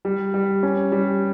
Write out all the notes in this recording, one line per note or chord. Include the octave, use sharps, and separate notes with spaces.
G3
G3
C#4
G3